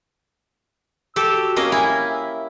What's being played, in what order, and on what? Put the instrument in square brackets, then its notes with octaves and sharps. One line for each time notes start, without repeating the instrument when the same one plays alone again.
[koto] G4 A4 [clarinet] E6
[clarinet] F#4
[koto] A#3 C#4 D#5
[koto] E4 [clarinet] G#5
[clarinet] E5